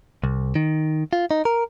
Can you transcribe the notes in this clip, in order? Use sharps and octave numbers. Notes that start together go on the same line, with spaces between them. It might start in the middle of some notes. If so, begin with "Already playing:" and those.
C2
D#3
F4
D#4
A#4